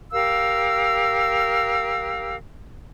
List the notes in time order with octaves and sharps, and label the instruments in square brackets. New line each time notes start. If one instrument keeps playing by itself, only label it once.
[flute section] G4 A#4 F5 E6